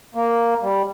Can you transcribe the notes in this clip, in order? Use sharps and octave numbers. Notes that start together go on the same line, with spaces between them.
A#3
G3